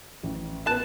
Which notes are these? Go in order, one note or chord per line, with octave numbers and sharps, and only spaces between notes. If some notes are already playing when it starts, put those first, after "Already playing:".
A1
B3 A#4 A5 F#6